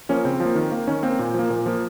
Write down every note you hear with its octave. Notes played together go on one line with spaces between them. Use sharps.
F3 A#3 C#4
C#3 C4
F3
A#3
D#3
A#3
D#3 C#4
A#3 C4
A#2
F3 A#3
A#2
F3 A#3